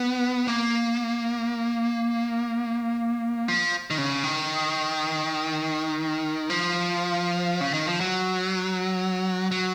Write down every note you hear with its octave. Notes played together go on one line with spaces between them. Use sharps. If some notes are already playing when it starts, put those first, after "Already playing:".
Already playing: B3
A#3
F3
D#3
C#3
D#3
F3
C#3
D#3
F3
F#3
F#3